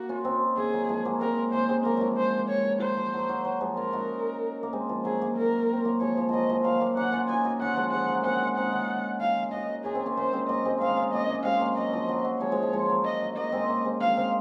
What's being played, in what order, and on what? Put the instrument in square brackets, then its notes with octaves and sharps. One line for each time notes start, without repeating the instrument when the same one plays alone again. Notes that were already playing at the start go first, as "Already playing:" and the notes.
Already playing: [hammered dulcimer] A#3 [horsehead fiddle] F#4
[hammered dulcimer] C#4 F4
C4 D#4
[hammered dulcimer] A#3 C#4 [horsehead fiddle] G#4
[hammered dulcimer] F#3
F3 G#3
F#3 A#3
[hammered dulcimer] G#3 C4 [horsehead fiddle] A#4
[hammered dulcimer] A#3 C#4 [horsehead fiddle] C5
[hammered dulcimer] G#3 C4
[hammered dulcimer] F#3 A#3 [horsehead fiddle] A#4
[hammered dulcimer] F3 F#3 G#3
[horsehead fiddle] C5
C#5
[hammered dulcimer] F#3 [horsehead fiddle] C5
[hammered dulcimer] F3
F#3
F#3
F#3
F3 G#3
[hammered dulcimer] C#4 F4 [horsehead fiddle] A#4
[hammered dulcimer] D#4 F#4
A#3
G#3 C4
F3
[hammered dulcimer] F#3 [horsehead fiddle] G#4
[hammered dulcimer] F#3 A#3
[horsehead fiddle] A#4
[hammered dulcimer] C4
F#3 A#3
[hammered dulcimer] F3 G#3 [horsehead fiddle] C#5
[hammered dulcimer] F3
[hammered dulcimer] F3 F#3 [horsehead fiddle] D#5
[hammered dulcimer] F3 G#3
[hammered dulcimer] F#3 A#3 [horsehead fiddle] F5
[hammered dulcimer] F#3 A#3
[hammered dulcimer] A#3 C#4 [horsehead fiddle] F#5
[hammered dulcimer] C#4 F4
[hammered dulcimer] D#4 F#4 [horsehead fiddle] G#5
[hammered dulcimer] D#4 F#4
[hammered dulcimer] C#4 F4 [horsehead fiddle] F#5
[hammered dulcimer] F3 G#3
[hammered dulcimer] F3 G#3 [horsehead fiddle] F#5
[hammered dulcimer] F#3
[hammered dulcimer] G#3 A#3 C4 [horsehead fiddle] F#5
[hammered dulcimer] C4 D#4 [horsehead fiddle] F#5
[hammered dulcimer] C#4 F4
[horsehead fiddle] F5
[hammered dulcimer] D#4 F#4 [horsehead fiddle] D#5
[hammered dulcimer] C#4 F4 [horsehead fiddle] G#4
[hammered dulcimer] C4 D#4
A#3 C#4
[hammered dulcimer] A#3 C#4 [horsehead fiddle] C5
[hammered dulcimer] G#3 C4
[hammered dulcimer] F#3 A#3 [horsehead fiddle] D#5
[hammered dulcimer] G#3 C4
[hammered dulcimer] C4 D#4 [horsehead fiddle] F5
[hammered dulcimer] C#4 F4
[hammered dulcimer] A#3 C#4 [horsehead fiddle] D#5
[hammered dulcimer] A#3 C#4
[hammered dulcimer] G#3 C4 [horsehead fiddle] F5
[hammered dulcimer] F#3 A#3
[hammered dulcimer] F#3 [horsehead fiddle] D#5
[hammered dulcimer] F3
F#3
F#3
[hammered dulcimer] F3 G#3 [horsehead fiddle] C#5
[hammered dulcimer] F3 G#3
F3 G#3
F3 G#3
F#3
[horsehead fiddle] D#5
[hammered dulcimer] F#3
[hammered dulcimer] F#3 A#3 [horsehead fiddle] D#5
[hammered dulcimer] G#3 C4
A#3 C#4
G#3 C4
[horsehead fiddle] F5
[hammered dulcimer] C4 D#4